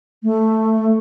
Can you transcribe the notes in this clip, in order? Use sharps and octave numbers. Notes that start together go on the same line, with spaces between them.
A3